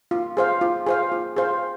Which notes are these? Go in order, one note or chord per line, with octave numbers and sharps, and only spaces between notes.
F4
G#4 C5 F5
F4
G#4 C5 F5
F4
G#4 C5 F5